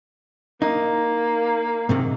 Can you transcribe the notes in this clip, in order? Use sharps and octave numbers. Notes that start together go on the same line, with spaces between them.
A#3 D#4
G#2 C3 D#3